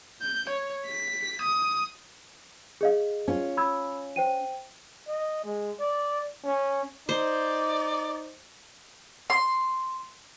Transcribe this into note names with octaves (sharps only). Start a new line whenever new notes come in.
G6
C#5
B6
D#6
G#4 D#5 F5
C#4 F4
B5 E6 G#6
C5 G5 D#7
D#5
G#3
D5
C#4
D#4 C5 D5
C6